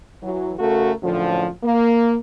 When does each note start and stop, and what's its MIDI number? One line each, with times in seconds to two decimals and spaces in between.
0.23 0.52 52
0.23 0.52 54
0.59 0.91 49
0.59 0.91 57
0.59 0.91 66
0.59 0.91 69
0.59 0.91 70
1.03 1.48 42
1.03 1.48 45
1.03 1.48 50
1.03 1.48 53
1.62 2.16 58